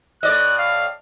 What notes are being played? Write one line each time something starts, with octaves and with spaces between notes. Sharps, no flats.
A2 D5 D#5 F#6
F5